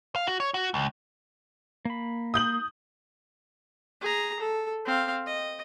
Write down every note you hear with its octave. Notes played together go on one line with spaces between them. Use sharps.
F5
F#4
C#5
F#4
C#2
A#3 B5
D#6 G6 F#7
G#4 A#5
A4
C4 F5
D#5